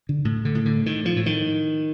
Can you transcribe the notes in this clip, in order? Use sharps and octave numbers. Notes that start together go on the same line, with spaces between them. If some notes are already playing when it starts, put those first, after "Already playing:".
D3
A2
D3
A2
D3
A2 D#3
F3
A2
D#3